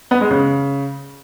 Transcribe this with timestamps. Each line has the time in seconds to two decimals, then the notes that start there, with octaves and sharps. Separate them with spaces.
0.11 B3
0.21 G#3
0.31 C#3